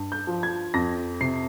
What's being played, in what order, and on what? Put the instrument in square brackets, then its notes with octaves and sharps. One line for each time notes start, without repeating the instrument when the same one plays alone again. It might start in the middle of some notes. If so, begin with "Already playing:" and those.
Already playing: [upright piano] G2
G6
F3
G#6
F2 A#6
C3 C7